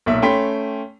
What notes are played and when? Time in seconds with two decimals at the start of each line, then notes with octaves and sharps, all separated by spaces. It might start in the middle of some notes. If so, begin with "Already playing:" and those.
0.06 B1 A#2 E5
0.22 A3 C#4 G5 B5 C6 B6